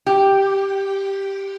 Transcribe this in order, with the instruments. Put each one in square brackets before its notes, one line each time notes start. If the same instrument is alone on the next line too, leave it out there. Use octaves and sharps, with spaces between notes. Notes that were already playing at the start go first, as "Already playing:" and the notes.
[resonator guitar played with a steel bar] G4